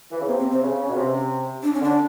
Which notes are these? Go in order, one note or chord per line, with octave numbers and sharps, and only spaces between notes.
E3
C#3
C3 B3
C4
C4
C3
C#3 C#4
B2
C3
D4
C#4
D3 D4